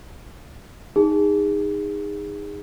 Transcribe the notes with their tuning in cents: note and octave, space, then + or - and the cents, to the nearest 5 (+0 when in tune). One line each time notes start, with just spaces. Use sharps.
D#4 +0 G#4 -30